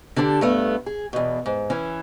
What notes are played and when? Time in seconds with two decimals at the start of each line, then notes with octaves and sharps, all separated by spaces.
0.16 D3 D4 G4 A5
0.41 G2 A3 B3
0.86 G#4
1.13 E2 B2
1.46 G#2
1.70 E3 C#4